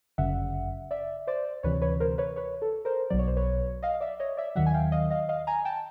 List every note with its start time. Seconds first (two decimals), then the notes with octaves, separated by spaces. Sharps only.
0.18 G1 F#2 C#3 E5 F#5
0.91 D5 E5
1.27 C5 D5
1.63 D2 C3 E3 B4 C#5
1.82 B4 C#5
2.00 A#4 C5
2.18 B4 C#5
2.36 B4 C#5
2.62 A4
2.85 A#4 C5
3.10 B1 B2 F#3 D5
3.19 C#5
3.28 C5
3.36 B4 C#5
3.83 D#5 F5
4.01 D5 E5
4.20 C#5 D#5
4.37 D5 E5
4.55 D#2 D#3 F#3 E5 F#5
4.66 G#5
4.74 F5 G5
4.92 D#5 F5
5.11 D#5 F5
5.29 D#5 F5
5.47 G#5 A#5
5.65 G5 A5